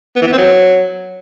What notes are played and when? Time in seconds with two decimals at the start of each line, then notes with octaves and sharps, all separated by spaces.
0.16 B3
0.22 E3
0.27 B3
0.32 C4
0.38 F#3